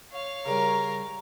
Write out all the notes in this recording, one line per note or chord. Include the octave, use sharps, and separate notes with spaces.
C#5 F5
C#3 G3 A#4